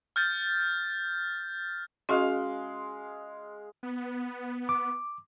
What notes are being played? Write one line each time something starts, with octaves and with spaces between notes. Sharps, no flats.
F6 G6 A6
G#3 C#4 F#4 D#5 F5
B3
D6